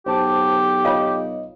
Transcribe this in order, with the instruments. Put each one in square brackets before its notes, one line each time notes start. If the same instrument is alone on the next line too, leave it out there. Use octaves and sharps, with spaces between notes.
[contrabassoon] B1 [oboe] G4 [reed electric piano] C5 A5 D6
[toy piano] F4 C#5 F5 [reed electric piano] D#5